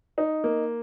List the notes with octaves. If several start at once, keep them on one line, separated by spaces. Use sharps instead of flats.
D#4
A#3